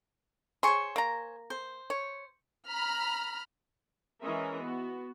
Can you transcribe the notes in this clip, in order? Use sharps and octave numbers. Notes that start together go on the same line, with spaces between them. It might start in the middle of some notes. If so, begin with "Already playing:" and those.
G#4 C5 C#5 C6 C#6
A#3 A#5
C5
C#5
A#5 B5 F6
E3 G#3 C#4 A#4 D#5 E5
B3 F#4